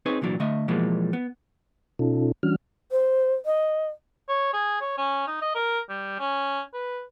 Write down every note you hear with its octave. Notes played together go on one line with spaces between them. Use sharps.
C4 D#4 G#4 B4 C#5
C2 A#2 E3 F#3 D4
D3 A3 D#5 E5
B2 E3 F3 G3 G#3 A#3
B3
B2 C#4 D#4 F4 A4
E3 G3 C#4 D4 F#4 F6
C5
D#5
C#5
G#4
C#5
C#4
D#4
D#5
A#4
G3
C#4
B4